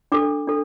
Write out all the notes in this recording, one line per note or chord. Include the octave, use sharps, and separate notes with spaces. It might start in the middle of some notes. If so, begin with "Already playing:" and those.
D4 A4 D6
D4 A4